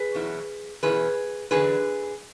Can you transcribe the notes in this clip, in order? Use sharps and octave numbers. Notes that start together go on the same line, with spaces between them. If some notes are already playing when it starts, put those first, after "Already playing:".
Already playing: G#4 B4
E2 B2 F#3 C#4 E4
E2 B2 F#3 C#4 E4 G#4 B4
E2 D3 F#3 G#4 B4